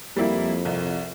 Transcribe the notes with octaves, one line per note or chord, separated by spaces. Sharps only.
F2 G3 A#3 E4
C2